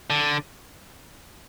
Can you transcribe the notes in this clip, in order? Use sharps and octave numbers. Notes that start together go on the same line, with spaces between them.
D3